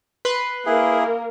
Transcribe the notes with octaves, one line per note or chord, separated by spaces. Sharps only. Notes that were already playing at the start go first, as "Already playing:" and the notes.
B4 C6 F#6
A#3 E4 G#4 A#4